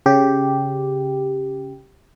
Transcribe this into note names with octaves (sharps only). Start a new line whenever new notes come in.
C#3 G4